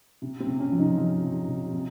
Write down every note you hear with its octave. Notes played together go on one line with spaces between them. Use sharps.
C3
C4
C3
C#4
F3
D#4
F3
C3
C3
C3